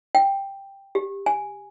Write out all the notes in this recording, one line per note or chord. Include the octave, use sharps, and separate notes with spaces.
G5
G4
G#5